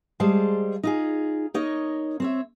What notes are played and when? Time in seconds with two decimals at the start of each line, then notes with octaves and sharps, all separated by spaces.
0.20 G3 G#3 G#4 C5 F5 A5
0.83 D#4 F4 G#4
1.54 A#3 D#4 C#5 D#5
2.20 C4 C#5 E5